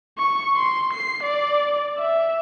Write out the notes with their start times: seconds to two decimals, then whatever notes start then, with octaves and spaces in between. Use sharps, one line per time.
0.18 C#6
0.56 C6
0.93 C7
1.23 D5
1.98 E5